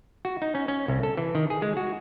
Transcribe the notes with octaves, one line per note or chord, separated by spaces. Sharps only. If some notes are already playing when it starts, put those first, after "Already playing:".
F#4
D#4
C#4
C#4
C2
A4
E3
D#3
G#4
G#3
F#4